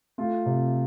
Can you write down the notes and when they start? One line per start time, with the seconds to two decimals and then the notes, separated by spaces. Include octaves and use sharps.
0.18 A3 F4
0.46 C3